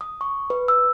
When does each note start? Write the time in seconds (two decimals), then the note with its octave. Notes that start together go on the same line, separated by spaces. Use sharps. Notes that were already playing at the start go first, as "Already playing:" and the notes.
0.01 D#6
0.21 C#6
0.50 B4
0.68 E6